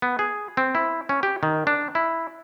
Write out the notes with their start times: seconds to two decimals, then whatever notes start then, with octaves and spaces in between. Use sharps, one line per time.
0.02 B3
0.19 G#4
0.57 C4
0.75 E4
1.09 C#4
1.23 G4
1.43 D#3
1.67 D4
1.95 E4